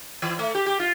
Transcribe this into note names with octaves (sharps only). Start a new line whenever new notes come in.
E3
A3
G4
G4
F4